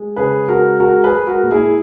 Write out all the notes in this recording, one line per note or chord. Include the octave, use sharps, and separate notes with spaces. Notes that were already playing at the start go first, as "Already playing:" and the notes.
Already playing: G#3
C#3 G#4 B4
G#3 F#4 A#4
G#3 F#4 A#4
G#4 B4
G#3
F#4 A#4
A#2
E4 G#4